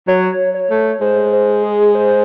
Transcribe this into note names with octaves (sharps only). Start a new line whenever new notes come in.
F#3 C#5
C#5
A3
G#3 C5
C5
G#4
C5